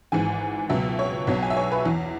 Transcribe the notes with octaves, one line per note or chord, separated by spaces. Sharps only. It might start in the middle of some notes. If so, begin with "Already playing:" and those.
G#1 G#2 E3 G#5
C#2 B2 F#3 E5
C#5
B1 B2 F#3 C#5
G#5
E5
C#5
B4
E2 E3